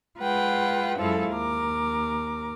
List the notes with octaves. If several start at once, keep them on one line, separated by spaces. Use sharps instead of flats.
G#3 F4 B4 F#5 G5
F#2 F3 G#3 E4 A4 F5
D#2 A#4 D6